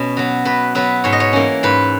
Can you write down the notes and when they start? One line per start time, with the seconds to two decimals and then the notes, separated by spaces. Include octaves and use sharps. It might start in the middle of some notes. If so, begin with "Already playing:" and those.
Already playing: B2 C#4
0.17 F#3 B3
0.45 B2 B4
0.75 F#3 B3 B4
1.04 G#2 C#5
1.12 D#5
1.20 C#5
1.33 E3 A#3 C#4
1.63 G#2 B4